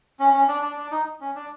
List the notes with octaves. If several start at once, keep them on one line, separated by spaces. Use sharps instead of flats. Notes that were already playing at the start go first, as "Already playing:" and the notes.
C#4
C#4
D4
D4
D4
D#4
C#4
D4